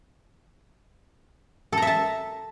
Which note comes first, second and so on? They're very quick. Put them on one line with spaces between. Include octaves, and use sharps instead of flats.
A4 A#5 E5 A5